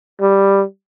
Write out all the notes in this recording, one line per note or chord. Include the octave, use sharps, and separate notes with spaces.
G3